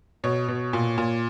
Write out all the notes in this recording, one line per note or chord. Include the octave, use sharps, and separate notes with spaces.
B2 C#5
B2
A#2
A#2